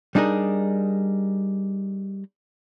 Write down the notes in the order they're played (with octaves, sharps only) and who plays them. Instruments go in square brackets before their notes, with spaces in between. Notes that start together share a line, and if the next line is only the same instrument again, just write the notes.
[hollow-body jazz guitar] G3 D4 D#4 G#4 A#4